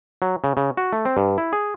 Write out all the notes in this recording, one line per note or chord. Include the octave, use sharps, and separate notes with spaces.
F#3
C#3
C#3
F#4
A3
C4
G2
E4
G#4